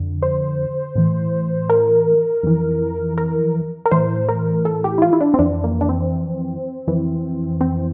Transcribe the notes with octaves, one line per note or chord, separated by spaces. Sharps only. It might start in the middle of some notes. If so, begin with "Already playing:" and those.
Already playing: F2 D3
C5
A2 E3
A#4
F2 E3
A#4
A#4
A2 E3 C5
A#4
A4
G4
E4
F4
E4
D4
C4
F2 E3 D4
A#3
D4
C4
F2 E3
C4